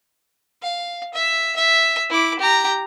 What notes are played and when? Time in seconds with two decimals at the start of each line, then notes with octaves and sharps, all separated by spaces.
0.62 F5
1.14 E5
1.56 E5
2.10 E4 D6
2.40 G4 A#5